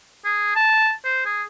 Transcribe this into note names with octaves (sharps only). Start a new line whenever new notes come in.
G#4
A5
C5
G#4